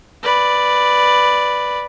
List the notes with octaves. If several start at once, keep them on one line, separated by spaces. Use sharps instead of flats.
B4 D5